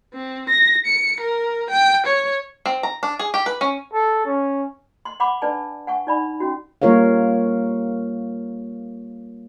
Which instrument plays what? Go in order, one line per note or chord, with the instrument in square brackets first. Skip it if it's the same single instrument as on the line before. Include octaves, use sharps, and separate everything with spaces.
[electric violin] C4
A#6
C#7
A#4
G5
C#5
[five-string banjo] C4
A#5
D4
G#4
G4
B4
C#4
[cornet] A4
C#4
[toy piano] C6
F#5 B5 C6 D6
D4 B4 D5 G#5 A5
F#5 G#5 C#6
D#4 D5 B5
C#4 F#4
[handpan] G3 A#3 F4 A#4 C#5 F5